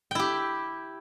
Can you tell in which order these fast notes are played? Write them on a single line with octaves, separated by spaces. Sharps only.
G5 E4 G4